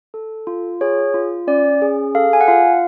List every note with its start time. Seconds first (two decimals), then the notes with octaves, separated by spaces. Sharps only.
0.14 A4
0.47 F4
0.81 G#4 C#5
1.14 F4
1.47 C#4 D5
1.82 G#4
2.15 A4 F5
2.33 G#5
2.41 F#5
2.48 F4 F5